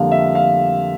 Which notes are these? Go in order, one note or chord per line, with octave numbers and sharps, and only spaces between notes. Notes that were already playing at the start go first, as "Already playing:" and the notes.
Already playing: F2 D3 G3 A#3 F5
E5
F5